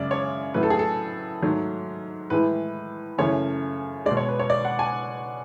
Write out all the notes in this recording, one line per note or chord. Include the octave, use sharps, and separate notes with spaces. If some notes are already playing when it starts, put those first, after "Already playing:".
Already playing: F#2 C#3 G#3 D5 E5
C#5
A2 F#3 A3 B4
A4
G#4
A4
G#2 F#3 A3
A2 E3 G#3 B4
F#2 C#3 E3 A3 C#5
G#3 D5
B2
C#5
B4
C#5
D5
F#5
G#5